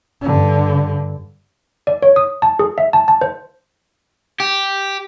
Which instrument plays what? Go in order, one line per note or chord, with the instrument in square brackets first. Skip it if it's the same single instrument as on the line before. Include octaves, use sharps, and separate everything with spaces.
[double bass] G2 D3
[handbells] D5
C#5
D#6
A5
G#4
E5
A5
A5
C5
[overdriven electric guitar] G4